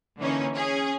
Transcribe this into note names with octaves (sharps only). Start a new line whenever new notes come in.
D3 E3 A#3 C#4 D#4
C#4 G#4